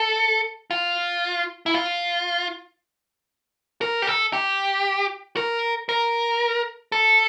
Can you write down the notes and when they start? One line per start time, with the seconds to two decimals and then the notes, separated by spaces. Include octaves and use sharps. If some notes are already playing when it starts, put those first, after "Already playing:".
Already playing: A4
0.71 F4
1.66 E4
1.74 F4
3.81 A#4
4.02 G4
4.07 A4
4.33 G4
5.37 A#4
5.89 A#4
6.92 A4